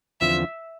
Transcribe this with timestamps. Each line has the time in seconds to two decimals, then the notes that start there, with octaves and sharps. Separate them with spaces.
0.21 E2 D3 F3 C4 F4 E5